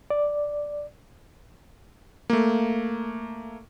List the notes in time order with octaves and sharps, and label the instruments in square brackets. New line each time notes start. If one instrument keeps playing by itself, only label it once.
[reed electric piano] D5
[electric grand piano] A3 A#3